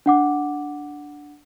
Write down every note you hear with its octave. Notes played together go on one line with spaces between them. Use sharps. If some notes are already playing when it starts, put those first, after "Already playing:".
D4 F#5 D6